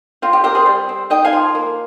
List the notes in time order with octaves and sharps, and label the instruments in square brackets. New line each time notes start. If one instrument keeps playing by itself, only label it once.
[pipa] C4 F4
G4
C4 G4 A#4
G#4 C5
G3
C4
D#4 D#5 G5
F5 G#5
F3
A#3